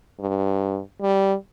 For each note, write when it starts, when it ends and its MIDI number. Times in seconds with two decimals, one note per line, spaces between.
0.20 0.79 43
1.01 1.34 55